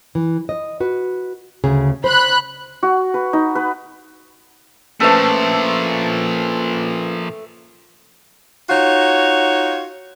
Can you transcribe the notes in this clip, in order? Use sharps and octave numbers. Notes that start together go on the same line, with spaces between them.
E3
D#5
F#4 B4
D2 C#3 G#4
C5 B5 F#6
F#4
B4
D#4
B4
A#2 F3 A3 C#4 A4 B4 C5
D#4 F4 F#4 C#5